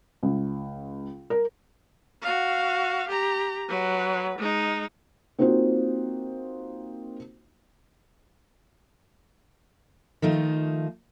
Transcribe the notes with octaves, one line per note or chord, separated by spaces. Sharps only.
C#2
A#4
F#4 F5
G4 A#5
F#3 B4
G#3 D#4
A#3 C4 D#4 F4 F#4 C5
D#3 F3 A3 D#4